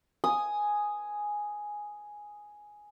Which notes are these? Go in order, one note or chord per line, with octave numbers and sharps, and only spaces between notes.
G#5 D#6